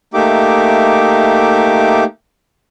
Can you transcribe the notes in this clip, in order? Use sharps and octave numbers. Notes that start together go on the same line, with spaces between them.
A3 A#3 D#4 G4 E5 D6